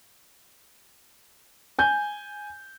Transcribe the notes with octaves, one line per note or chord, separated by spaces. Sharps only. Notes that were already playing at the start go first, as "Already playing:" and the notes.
G#5 G6